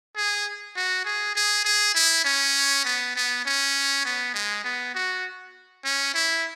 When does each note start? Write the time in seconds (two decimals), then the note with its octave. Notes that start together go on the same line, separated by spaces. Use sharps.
0.16 G#4
0.76 F#4
1.05 G#4
1.36 G#4
1.65 G#4
1.95 E4
2.25 C#4
2.85 B3
3.16 B3
3.46 C#4
4.05 B3
4.34 G#3
4.65 B3
4.95 F#4
5.85 C#4
6.14 E4